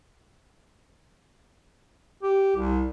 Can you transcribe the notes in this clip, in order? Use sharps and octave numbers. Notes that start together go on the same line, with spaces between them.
G4
C2